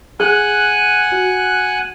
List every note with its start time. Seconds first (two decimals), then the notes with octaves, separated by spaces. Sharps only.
0.20 G#4 F#5 G#5 F#6
1.12 F#4